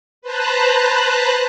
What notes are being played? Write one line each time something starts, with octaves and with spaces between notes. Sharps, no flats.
B4 C5 A5 A#5 F#6